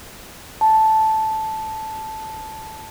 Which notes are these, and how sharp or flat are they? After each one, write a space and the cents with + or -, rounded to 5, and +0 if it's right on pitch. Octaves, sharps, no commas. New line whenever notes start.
A5 -5